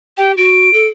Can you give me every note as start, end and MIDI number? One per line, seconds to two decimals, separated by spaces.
0.18 0.35 67
0.18 0.32 79
0.37 0.72 66
0.37 0.86 98
0.73 0.87 69